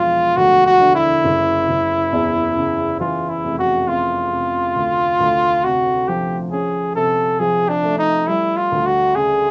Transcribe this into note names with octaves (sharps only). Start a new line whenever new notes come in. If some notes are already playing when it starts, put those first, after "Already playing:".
Already playing: E1 F3 F4
D2 F#4
F#4
D3
E4
F#1
F#1
E2
C#3
E3 F4
E4
F1
F#4
F2 F4
C3
D2
D2
C3 F#4
F3 G4
C#4 G#4
C3 A4
F3 G#4
D4
A3
D#4
G3 E4
F4
D2
F#4
C#3 G#4